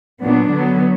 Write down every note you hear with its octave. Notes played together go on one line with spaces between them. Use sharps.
A#2 F#3 B3 D4
D3 F#3 B3